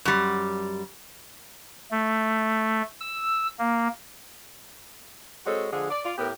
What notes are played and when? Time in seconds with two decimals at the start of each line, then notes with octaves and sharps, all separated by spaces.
0.05 F#2 G3
1.91 A3
3.01 E6
3.59 A#3
5.46 G#3 C4 F#4 A4 C#5
5.71 D3 F3 G#3 G#4
5.89 D5
6.04 F4 D5
6.18 A2 B3 G4 A#4